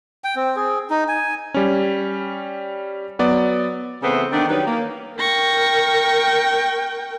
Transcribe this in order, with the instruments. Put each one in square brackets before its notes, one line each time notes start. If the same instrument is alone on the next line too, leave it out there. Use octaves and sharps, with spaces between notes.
[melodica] G5
C4
G#4
D#4
G#5
[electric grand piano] G3 C#4
F#3 B3 D5
[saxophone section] C#3 E3 A3 B3 C4
D#3 B3 D4
D#3 F#3 G3 C#4 D#4 B4
A#3
[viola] A#4 G5 [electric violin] C#6 A#6